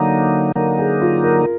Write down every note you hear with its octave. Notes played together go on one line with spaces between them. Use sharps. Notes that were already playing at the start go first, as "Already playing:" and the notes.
Already playing: D3 F#3 A#3 D#4
D3 F#3 A#3 D#4 A#4
G#4
F4
A#4